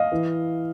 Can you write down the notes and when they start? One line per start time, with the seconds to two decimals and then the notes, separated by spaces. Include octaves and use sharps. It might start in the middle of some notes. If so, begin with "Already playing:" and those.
Already playing: D#5 F5
0.12 E3